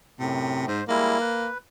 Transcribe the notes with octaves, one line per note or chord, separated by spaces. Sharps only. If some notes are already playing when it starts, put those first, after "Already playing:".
F#2 A2 C3
G#2 C5
G3 G#3 A#3 E4
B4